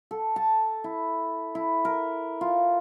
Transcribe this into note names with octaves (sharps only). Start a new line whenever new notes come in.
A4
A5
E4
E4
A#4
F4